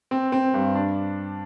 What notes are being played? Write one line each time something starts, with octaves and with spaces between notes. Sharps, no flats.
C4
C4
G2
D4